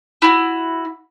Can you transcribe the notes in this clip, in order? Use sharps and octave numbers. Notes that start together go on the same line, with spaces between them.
E4 F#4